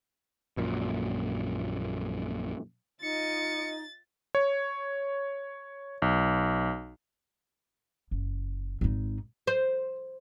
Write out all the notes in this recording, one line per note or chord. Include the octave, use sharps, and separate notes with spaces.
A#1 F#2 A#2
D#4 F4 D#5 A6 C#7
C#5
B1
F#1
G#1 D#4
C5